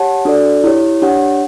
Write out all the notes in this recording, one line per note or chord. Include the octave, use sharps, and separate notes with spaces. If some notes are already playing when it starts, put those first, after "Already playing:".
Already playing: G4 C#5 F#5 A5
D4 F#4 A4 D5
E4 G4 C#5
D4 G4 C#5 F#5